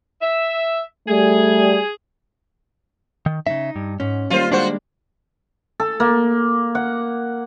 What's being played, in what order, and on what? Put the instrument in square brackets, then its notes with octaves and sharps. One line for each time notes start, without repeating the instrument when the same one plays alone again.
[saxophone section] E5
[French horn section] G3 A3 [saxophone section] G#4
[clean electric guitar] D#3
[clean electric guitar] C#3 E5 [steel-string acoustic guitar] D#4
[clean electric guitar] G2
[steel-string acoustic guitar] G#2 [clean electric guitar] C#4
[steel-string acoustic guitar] D#3 G3 A#3 [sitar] F4 C5
[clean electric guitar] G#3 D4 [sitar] F4 F#4 C5
[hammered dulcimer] A4
A#3
F#5